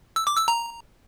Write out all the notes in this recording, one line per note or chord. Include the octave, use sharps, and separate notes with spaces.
E6
D6
E6
A#5